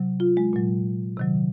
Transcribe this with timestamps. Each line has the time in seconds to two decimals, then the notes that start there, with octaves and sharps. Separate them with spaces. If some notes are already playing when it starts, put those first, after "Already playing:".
Already playing: C3 F#3
0.20 F4
0.37 G#3
0.53 A#2 F#3
1.17 C3 D#3 F#3